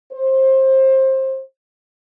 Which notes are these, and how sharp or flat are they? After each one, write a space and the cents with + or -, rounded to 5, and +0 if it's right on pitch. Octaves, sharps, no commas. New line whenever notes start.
C5 +20